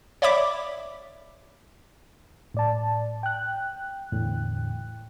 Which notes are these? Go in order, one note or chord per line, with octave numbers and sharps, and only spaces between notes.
C#5 D5 E5 B5 D6
A2 D5 A5
G5 F#6
E2 A2 D3